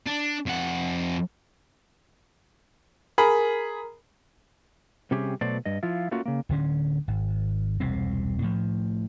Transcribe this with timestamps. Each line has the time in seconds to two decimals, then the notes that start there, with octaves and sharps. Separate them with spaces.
0.06 D4
0.46 F2 F#5
3.18 G#4 A#4 B5
5.11 C3 G3 C#4 G4 G#4
5.41 B2 F#3 A3 C5 D5
5.66 G2 D#5
5.83 F3 E4 F4
6.11 A3 A#3 C#4 F4 F#4
6.26 C#3 A#3
6.49 D1 D3 C#4
7.08 G#1
7.80 E1 C2 C3 C4
8.42 A2 F3